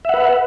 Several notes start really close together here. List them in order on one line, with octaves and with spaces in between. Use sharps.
E5 F#5 B4